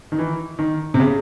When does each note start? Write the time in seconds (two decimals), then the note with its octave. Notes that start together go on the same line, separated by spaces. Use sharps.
0.12 D#3
0.18 E3
0.59 D#3
0.94 C3
1.00 C#3